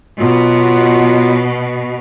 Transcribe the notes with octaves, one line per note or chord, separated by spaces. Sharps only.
B2 F#3 B3 F4